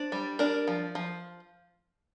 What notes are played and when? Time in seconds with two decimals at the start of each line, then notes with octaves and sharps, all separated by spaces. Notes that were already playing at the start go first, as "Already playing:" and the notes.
Already playing: D4 C5
0.12 G3
0.39 D4 A#4
0.67 F3
0.95 F3